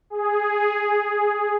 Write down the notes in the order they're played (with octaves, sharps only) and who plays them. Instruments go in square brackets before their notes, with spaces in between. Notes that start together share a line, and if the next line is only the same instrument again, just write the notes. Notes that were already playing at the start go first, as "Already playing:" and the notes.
[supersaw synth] G#4